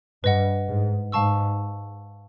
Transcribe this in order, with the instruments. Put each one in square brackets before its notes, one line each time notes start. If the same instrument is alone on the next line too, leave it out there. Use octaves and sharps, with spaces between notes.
[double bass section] G2 [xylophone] B4 D#5 F#5
[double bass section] G#2
[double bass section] G#2 [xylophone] F5 A5 C#6 E6